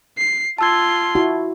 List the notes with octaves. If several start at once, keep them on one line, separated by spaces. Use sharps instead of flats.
C7
F4 A5 C6 E6 G#6
E4 F#4